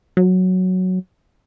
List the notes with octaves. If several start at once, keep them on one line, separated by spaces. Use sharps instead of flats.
F#3